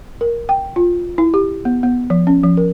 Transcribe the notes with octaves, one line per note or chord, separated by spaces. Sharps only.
A#4
G5
F4
E4
G4
B3
B3
F3
C#4
F3
A#4